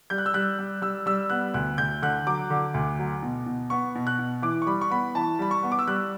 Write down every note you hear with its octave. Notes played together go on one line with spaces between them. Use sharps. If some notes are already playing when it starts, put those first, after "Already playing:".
G3 G6
F#6
E6
G3 F#6
G3
G3 E6
G3 E6
B3 F#6
D2 F#6
D2 G6
D3 F#6
F#3 D6
D3
D2
F#3
B2
B2
B3 C#6
B2
F#6
B2
E3 D6
C#6
G3 B5
C#6
B3 B5
E3 A5
G3 B5
C#6
B3
D6
E6
G3 F#6